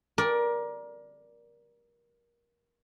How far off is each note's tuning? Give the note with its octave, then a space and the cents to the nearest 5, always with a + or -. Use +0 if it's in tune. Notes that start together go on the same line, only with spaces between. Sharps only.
A#4 +25 D5 +0